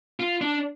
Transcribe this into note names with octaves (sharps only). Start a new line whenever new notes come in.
F4
D4